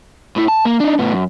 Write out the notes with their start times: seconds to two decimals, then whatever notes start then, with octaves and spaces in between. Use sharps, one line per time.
0.36 A2 E4
0.48 A5
0.65 A#3
0.80 D4 D#4
0.99 A2 B3
1.13 F#2